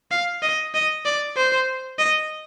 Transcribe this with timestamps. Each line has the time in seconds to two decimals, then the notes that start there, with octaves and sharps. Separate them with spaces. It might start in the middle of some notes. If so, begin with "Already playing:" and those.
0.11 F5
0.42 D#5
0.74 D#5
1.05 D5
1.36 C5
1.99 D#5